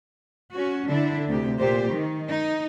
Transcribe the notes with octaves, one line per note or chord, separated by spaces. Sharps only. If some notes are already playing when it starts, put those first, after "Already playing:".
C#4 F#4
D3 D4 E4
D2 C3 G4
A#2 G4 C5
D#3
D#4